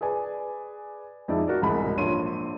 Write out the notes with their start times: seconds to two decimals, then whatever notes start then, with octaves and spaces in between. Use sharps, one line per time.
0.01 G#4 B4 D5 G#5
1.28 F2 G#3 D#4 E4 D5
1.47 F#4 A#4 D5
1.62 E1 C2 G#2 G#5 B5
1.97 A#1 D4 A4 C#5 C6 D#7